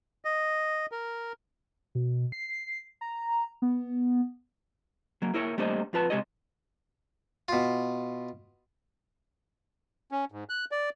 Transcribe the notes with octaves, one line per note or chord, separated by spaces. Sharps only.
D#5
A#4
B2
C7
A#5
B3
F#3 A#3
A#3 E4 A#4 C#5
G3 A3 A#3 D4 C5 D#5
F2 F4 B4 A5
C3 G#3 G4 C#5 D#5
B2 F4
C#4
G#2
F#6
D5